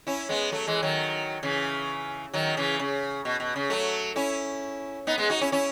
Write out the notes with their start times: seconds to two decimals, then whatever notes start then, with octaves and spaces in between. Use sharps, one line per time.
0.07 C#4 E4
0.29 G#3 B3
0.52 F#3 A3
0.67 E3 G#3
0.83 D#3 F#3
1.43 C#3 E3
2.33 D#3 F#3
2.57 C#3 E3
2.80 C#3
3.25 B2
3.40 B2
3.56 C#3
3.70 F#3 A3
4.16 C#4 E4
5.07 B3 D#4
5.18 G#3 B3
5.30 D#4 F#4
5.41 C#4 E4
5.52 C#4 E4